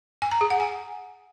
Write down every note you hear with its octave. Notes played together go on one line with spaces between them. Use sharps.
G#5
A#5
G#4
F#5
G#5